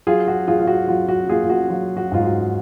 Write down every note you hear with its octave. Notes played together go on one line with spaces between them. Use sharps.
F#3 F4 G#4
F#4
F#3 F4 G#4
F4
F#4
F#3 F4
F#4
A#3 F4 G#4
F4
F#4
F#3 F4
F#4
G#2 F4
F#4